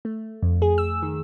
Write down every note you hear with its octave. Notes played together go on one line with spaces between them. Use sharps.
A3
F2
G#4
E6
D#3